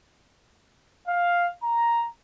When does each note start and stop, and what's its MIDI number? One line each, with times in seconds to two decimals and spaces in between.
1.08 1.47 77
1.63 2.04 82